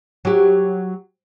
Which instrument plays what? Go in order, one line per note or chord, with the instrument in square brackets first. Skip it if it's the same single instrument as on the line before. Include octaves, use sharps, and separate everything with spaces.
[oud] F#3 G4